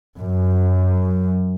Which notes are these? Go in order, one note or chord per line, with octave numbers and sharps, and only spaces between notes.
F#2